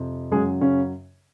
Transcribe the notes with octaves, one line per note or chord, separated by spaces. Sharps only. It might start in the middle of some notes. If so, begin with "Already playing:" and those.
Already playing: F2 C3
F#2 C#3 F#3 G#3 G#4
C#3 C#4